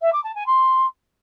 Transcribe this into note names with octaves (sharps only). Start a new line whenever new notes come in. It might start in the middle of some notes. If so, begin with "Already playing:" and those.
E5
D6
A5
G#5
C6